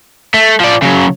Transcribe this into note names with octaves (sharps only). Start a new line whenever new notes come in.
A3
F3 D5
C#3 F#3